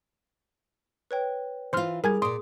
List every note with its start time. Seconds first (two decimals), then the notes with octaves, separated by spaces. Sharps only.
1.11 B4 C#5 G5
1.73 E3 F4 C5 C6 F6
2.04 G3 G#4 A#4 G#5 G#6
2.22 A#2 D5 C6 D#6